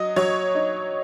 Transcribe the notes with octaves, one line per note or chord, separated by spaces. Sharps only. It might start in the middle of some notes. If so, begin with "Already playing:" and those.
Already playing: F#3 D#5
F#3 C#5
D#4